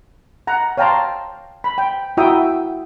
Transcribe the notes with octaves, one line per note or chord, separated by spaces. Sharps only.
F#5 A#5
C#5 F5 G5 A5 A#5 C6
B5
G5
E4 F#4 E5 G5 A#5 D#6